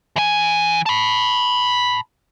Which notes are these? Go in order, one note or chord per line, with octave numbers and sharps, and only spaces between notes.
E3 G#5
A5 B5